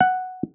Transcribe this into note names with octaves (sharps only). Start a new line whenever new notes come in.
F#5